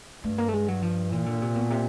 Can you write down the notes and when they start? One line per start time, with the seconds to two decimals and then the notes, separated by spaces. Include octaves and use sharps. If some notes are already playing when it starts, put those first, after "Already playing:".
0.23 G2 A3
0.38 A#3
0.48 A3
0.53 G#3
0.68 F#3
0.82 F3
1.11 A#2 E3
1.26 D3
1.42 C3
1.56 B2
1.70 C3